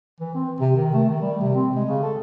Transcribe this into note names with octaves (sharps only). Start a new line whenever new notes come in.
E3
C4
C3
D#3
A3
D#3
G3
C3
C4
G#3
C#3
A4